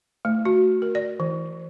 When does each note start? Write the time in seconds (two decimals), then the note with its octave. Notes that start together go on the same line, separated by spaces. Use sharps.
0.25 A3
0.45 F#4
0.82 A#4
0.95 D5
1.20 E3